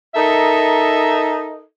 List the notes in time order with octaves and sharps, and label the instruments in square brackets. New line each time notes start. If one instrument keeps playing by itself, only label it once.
[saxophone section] D#4 A4 A#4 D#5 E5